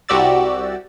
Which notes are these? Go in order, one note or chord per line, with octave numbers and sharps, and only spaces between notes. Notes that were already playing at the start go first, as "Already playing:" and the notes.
C2 F#4 G4 D5 E6 A6